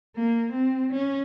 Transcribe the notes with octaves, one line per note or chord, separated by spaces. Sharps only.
A#3
C4
C#4